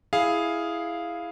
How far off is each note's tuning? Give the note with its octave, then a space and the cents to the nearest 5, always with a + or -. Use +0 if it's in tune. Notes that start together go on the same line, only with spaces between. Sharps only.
E4 +0 G#4 +0 F5 +0